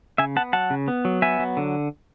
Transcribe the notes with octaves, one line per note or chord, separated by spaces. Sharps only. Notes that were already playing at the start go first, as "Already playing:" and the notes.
C#3 E5 G#5
B3 F#5 A5
F#3 F#5 A5
C#3
B3
F#3
B3 E5 G#5
F#3
D3